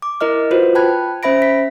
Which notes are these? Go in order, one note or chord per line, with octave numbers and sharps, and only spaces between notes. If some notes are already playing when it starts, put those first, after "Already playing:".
D6
E4 A#4 D#5 F6
F4 F#4 B4 C5
G5 A5 B5 F#6 G#6
C#4 C5 E5 B5 A#6 D7
B6